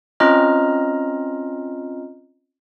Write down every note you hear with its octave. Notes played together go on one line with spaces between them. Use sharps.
C4 C#4 F4 D#5 A#5 F6